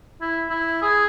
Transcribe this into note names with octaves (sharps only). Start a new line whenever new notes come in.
E4
E4
G#4